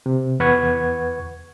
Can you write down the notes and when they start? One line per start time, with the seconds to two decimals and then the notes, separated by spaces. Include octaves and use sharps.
0.06 C3
0.40 E2 B4 F#5 C#6 G#6